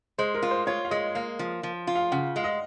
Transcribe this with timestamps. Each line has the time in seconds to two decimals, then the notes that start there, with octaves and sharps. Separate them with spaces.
0.18 G#3 C5
0.35 A#4
0.42 F4
0.51 C5
0.67 F4 C#5
0.85 F5
0.91 G#3 D#5
1.15 A#3 F5
1.39 F3
1.63 F3
1.87 F4
1.95 F5
2.12 C#3 F#5
2.36 G#3 F5
2.44 D#5